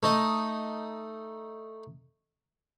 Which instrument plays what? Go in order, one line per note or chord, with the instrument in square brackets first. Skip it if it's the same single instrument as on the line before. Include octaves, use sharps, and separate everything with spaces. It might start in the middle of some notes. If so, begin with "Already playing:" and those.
[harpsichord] A3 D#4 D#5